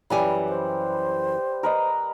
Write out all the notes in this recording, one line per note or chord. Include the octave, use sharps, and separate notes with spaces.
F#2 E3 G3 B4 G#5
C5
A#4 B4 D#5